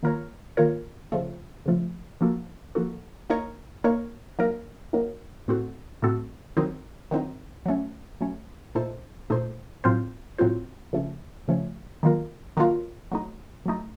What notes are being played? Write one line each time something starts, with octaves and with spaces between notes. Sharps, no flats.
D#3 A#3 F4 A#4 C#5
D#3 A#3 F4 A#4 C#5
C#3 F3 A3
C#3 F3 A3
F3 A#3 D#4 F#4 A4
F3 A#3 D#4 F#4 A4
A#3 D#4 A#4 C#5
A#3 D#4 A#4 C#5
F#3 A#3 D#4 A#4
F#3 A#3 D#4 A#4
A2 A3 C4 F#4 A4
A2 A3 C4 F#4 A4
D#3 F#3 C4 D#4
D#3 F#3 C4 D#4
F#3 A3 C#4
F#3 A3 C#4
A#2 A3 D#4 A4 C5
A#2 A3 D#4 A4 C5
A2 F#3 C4 F4 C5
A2 F#3 C4 F4 C5
C#3 F3 A3 C#4
C#3 F3 A3 C#4
D#3 F#3 A#3 F4 A#4
D#3 F#3 A#3 F4 A#4
F#3 A3 D#4
F#3 A3 D#4